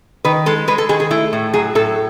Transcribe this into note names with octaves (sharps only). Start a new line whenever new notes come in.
D#3 B4
G#3 A4
G#3 B4
A4
D#3 G#4
G#4
A3 E4
A2
F#3 G#4
A2 A4